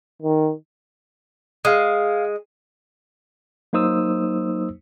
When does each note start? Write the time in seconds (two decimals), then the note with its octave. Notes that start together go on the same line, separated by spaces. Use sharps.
0.22 D#3
1.65 G#3 F5 D#6
3.73 F#3 A#3 D#4 C5 D#6 E6